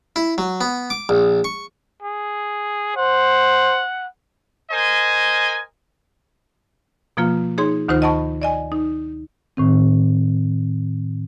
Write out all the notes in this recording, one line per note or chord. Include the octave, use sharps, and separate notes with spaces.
E4
F#3
B3
D6
A#1
C#6
G#4
C5 F#5
A#4 C5 D#5 G#5
B2 F3 A#3 F4
D#4 G#4 C#5 C6
D2 D#3 D#4 F4 C5
D#5 F#5 A5 B5 C#6
D5 D#5 G#5
D#4
A2 D#3 C4